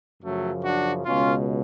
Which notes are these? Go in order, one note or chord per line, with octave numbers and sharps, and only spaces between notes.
F#2 C#3 F3 F#3 A3
D4 F#4
C#2 B2 C#4 F4